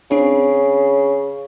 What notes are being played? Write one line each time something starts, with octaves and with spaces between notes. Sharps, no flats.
C#3 C4 D4